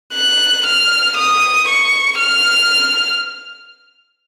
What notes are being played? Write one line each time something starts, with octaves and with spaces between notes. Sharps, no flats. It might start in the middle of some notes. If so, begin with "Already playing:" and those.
F#6
F6
D#6
C#6
F6